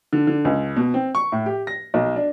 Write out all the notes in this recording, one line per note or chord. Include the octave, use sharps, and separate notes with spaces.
D3
D3
C#2
B2
C4
C#6
A2
G4
A#6
B1
D4